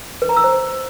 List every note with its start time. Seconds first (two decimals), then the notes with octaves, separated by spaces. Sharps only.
0.22 B4
0.29 A#5
0.37 E6
0.44 C5